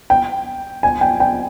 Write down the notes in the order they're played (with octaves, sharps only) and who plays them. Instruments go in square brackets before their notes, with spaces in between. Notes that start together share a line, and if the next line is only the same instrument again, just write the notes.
[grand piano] G5
G#5
G5
G5